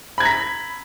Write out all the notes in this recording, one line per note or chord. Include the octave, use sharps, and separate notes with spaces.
A#5 B5 G#6 B6